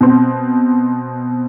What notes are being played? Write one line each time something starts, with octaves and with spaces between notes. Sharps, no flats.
B2 C4